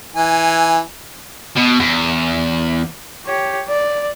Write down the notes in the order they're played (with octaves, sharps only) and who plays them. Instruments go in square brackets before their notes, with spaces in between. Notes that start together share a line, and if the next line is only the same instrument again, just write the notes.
[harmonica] E3 G#5
[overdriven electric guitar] B2
E2
[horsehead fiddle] G4 C#5
D5